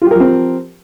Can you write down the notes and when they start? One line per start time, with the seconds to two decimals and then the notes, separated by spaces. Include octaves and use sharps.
0.02 F4
0.06 G4
0.11 A#4
0.16 F3
0.20 C4